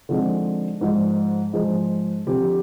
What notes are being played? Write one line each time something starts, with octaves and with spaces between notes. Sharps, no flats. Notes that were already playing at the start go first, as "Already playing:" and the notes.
D3 F3 G#3 C4 D#4
G#2 F3 G#3 D#4
G#2 F3 G#3 D#4
D3 F3 C4 G4